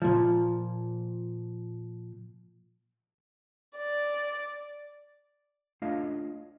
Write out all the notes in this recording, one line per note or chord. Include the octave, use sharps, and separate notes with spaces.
A#2 F3
D5
A3 D4 F4 C#5 D#5 F5